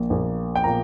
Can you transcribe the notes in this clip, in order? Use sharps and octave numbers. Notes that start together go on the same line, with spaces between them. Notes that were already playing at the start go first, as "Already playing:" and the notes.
Already playing: A#1 A#2 A#3
A#1 A#2 A#3
G5
A#2 A#3 A#5